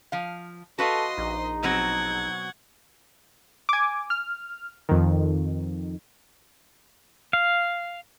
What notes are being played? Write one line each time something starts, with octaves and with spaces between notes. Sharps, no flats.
F3 F5
F#4 A4 B4 D#5 F5 C6
A#1 D#4
B2 F#3 C4 F#5 G#6
G#5 D6
F6
F2 D#3
F5